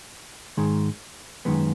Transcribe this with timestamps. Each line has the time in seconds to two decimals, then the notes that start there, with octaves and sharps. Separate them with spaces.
0.57 G#2 D#3 G#3
1.45 F#2 D#3 G#3 B3